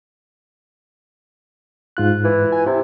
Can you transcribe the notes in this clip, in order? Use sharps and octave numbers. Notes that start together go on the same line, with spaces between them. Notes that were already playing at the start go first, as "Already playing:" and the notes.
G#2 F4 F#6
E3
G#5
C3 E4